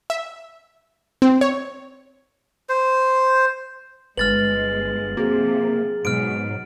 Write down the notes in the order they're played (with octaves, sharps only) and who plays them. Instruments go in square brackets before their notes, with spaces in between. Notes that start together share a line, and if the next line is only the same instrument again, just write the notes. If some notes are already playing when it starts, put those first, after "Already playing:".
[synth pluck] E5
C4
C#5
[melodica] C5
[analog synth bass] G1 [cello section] G#3 [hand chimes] B4 [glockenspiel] F6 A6 F#7
[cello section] C3 F3 [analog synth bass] A#3 [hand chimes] F#4 G#4
[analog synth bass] G#2 [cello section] B2 F#3 [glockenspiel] F6 D7